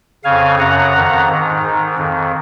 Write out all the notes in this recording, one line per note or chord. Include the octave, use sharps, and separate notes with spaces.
F2 C#3 F5 G#5
F#2 C#3 F#5 A#5
F2 D#3
G#2 D#3
G#2 D#3
F2 D#3